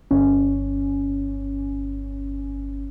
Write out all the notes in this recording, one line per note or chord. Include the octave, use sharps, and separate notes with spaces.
G1 C#4